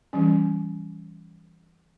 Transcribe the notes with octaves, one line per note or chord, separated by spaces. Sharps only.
E3 G3 C#4